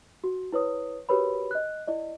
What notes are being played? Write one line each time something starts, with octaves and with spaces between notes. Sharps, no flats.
F#4
E4 B4 C#5 D#6
F#4 G4 A#4 B4 C#5 B5
D#5 F#6
E4 D5 D#5